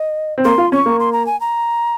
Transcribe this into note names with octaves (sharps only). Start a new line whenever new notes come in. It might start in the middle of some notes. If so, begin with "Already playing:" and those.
Already playing: D#5
C4
A#3 C6
F4
C#4 C#6
A#3
C6
A#5
G#5
A#5